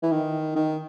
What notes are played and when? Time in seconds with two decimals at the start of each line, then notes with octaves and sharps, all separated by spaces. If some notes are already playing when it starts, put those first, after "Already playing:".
0.03 E3
0.11 D#3
0.55 D#3